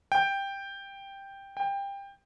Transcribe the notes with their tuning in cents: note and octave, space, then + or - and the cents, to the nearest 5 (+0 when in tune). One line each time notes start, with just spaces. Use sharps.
G5 +5
G5 +20